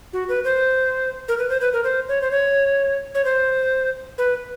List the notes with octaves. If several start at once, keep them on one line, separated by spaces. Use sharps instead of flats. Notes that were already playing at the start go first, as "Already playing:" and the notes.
F#4
B4
C5
A#4
B4
C5
B4
A#4
C5
C#5
C5
C#5
C#5
C5
B4